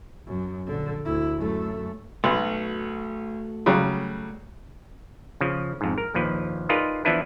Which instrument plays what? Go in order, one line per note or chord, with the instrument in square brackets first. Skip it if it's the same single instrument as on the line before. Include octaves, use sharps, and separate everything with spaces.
[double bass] F#2
A#1 D3
D2 E4
F#2 A3
[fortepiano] B1 [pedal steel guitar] A3 F#4 F#5
[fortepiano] C#3 F#3 G3
[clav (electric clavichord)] C#3 F3
F2 G#2
A#4
A#1 D#2 F3 B4
D#4 F4 G#4 A#4 B4 D5
E3 F3 B3 D4 E4 B4